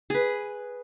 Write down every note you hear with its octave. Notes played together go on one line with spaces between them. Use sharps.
G#4 B4